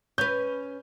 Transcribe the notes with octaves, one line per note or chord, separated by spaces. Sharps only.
C#4 B4 G6